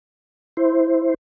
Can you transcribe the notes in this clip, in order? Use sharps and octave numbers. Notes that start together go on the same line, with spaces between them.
E4 C5